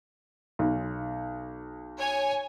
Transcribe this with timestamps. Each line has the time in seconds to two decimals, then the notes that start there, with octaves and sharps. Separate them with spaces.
0.59 B1
1.97 C#5 G#5